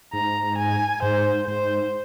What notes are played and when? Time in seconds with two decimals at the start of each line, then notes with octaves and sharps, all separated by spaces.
0.13 G#2 A#5
0.58 G#5
1.02 G#2 C5
1.47 G#2 C5